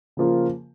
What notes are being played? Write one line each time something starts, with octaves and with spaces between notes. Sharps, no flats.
C#3 F3 A#3 F4